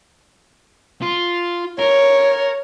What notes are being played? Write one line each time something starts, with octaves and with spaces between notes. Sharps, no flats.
F4
A#4 C#5